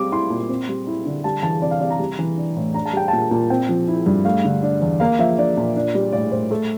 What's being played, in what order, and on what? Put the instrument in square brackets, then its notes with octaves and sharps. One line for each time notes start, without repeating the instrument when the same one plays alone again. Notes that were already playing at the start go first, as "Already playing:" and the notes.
Already playing: [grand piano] G3 C4 D6
E4 C6
A#2
C4
G3
E4
D3
G3 A5
E3 A5
C3 D5
F5
C3 D5
A#5
G3
E3
D4
A2
D4 A#5
A5
G3 G5
A#2 A5
A#2
C4 G5
F3
E4
G2
A3 F5
D3
D4
E2
A#3 F5
F3 E5
D4 D5
A#2
D4
G3
A2 D5
A2 C5
A3 A4